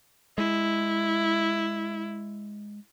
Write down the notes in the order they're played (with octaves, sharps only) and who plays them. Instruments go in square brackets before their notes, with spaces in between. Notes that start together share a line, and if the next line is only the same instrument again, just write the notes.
[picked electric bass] G#3 [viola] E4